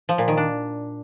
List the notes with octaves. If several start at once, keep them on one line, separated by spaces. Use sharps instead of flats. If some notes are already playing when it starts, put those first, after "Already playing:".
F3
A#2
D#3
D4